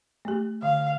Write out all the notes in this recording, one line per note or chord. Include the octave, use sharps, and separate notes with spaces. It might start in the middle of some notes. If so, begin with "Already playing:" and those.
A3 G4
D3 F5